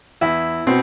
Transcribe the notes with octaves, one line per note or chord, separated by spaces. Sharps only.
E2 E4
B2 C4